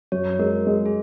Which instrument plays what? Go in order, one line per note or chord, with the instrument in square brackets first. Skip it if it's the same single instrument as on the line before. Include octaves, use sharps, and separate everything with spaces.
[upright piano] F#2 [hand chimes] C#5
[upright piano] G#3 [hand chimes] A#4
[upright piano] G#3
[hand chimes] G#4